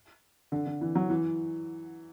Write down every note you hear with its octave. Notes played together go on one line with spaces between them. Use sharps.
D3
D3
E3
F#3
E3